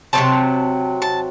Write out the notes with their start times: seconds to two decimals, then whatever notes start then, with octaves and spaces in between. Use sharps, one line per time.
0.13 C3 F#3 C4 A5
1.02 A5